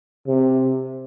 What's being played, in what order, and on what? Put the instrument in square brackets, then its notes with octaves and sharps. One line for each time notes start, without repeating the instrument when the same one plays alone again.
[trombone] C3